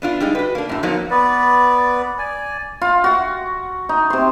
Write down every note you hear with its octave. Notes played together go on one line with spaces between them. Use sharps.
B3 D4 F4
G3 G#3 D#4
F#4 B4
A#3 D4
F#2 A2
F3 F#3 A#3 B3 D#4
B3 B4 D5
D5 G#5
F4
F#4 F#5
D#4
C3 C6